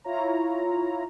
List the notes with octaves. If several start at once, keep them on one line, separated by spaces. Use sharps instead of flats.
E4 F4 C#5 A#5